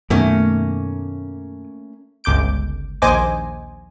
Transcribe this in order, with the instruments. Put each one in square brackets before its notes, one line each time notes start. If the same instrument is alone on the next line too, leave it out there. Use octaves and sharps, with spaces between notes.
[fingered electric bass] F#2 B2 D#3 [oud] A3 A#3 C#4
[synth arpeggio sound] G1 C#2 D6 G6 D7
A#1 D#2 C5 D#5 G#5 D6